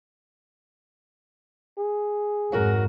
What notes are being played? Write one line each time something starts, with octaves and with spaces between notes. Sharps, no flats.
G#4
F2 G#2 F#3 F#4 A#4